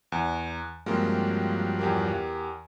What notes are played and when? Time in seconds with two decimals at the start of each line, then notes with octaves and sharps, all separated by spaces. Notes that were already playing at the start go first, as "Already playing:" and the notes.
0.12 E2
0.86 G2 F3 F#3 G#3 A#3 C4
1.79 E2 G4 A#4